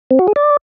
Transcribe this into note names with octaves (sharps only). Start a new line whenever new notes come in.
C4
F#4
G#4
D5